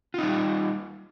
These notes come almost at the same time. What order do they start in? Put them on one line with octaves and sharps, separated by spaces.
F4 D#4 G3